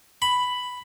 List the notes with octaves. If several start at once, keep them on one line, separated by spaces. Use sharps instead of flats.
B5